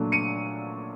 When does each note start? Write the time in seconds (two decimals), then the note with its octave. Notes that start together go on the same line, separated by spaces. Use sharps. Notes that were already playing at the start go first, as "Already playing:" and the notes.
Already playing: A#2 F#3 A3 D4
0.12 C#7 D#7